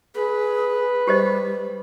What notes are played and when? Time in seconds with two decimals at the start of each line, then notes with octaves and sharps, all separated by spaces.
0.15 G#4 B4
1.07 G3 G4 C5 D#5